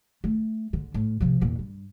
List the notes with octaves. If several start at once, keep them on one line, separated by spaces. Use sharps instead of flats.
A3
D3
A2
C3 F3
E2 A#2
G2